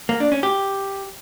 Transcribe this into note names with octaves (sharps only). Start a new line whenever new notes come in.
A#3
D4
C#4
G4